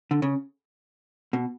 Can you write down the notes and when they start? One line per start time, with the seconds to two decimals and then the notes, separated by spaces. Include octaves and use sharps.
0.11 D3
0.22 C#3
1.33 B2